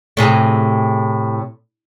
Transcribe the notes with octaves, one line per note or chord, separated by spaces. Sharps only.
A2 C3 G#4